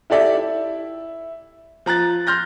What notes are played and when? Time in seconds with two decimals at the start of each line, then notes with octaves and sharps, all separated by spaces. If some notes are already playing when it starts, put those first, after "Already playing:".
0.10 E4 G4 A4 D5 E5
0.37 E4
1.86 F3 A#5 F#6 A6
2.27 C6 F6 G6 A#6